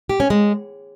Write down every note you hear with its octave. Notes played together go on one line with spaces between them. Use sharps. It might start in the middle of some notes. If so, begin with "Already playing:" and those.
G4
C#4
G#3